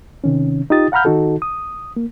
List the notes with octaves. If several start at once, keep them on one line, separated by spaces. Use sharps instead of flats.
C3 D#3 C#4
D#4 F4 G4 D#6 A6
F5 F#5 A#5 B5 F6 G6
D#3 D#4 F#4 A4
D#6
A#3